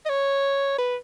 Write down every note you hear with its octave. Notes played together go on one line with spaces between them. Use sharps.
D#5
C#5
B4